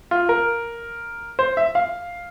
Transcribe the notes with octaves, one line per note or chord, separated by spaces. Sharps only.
F4
A#4
C5
E5
F5